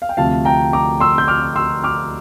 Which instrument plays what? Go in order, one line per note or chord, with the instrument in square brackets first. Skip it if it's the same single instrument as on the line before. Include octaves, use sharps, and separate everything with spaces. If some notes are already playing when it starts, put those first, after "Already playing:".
[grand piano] F5
G5
D2 C3 F3 A3 F5 A5
G5 A#5
A#5 D6
C6 E6
G6
D6 F6
C6 E6
D6 F6